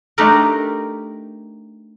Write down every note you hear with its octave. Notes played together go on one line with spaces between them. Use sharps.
A3 D4 D#4 G4 A#4